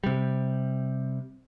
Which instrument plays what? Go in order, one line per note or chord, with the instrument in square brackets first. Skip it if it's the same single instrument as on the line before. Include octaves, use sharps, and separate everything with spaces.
[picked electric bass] C3 G3